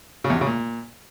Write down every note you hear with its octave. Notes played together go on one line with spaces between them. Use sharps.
C#3
E2
C3
C#3
A#2